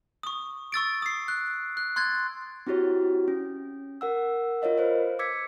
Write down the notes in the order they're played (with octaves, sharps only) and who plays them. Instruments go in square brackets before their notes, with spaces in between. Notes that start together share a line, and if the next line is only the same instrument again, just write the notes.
[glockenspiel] C#6 D#6
C#6 E6 A6 D7
D#6 C7
F#6
F#6
C6 F#6 G#6 A6
[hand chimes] C4 E4 F#4 G4 C#5
C#4
A#4 F#5 E6
F4 A#4 C#5 D#5 F5
B4 C5 F5
D6 E6 G#6 B6 C#7